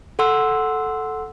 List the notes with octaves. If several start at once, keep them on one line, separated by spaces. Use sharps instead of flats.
A4 F#5 C6 E6